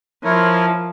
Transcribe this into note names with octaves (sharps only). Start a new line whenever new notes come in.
F3 E4 A#4 C#5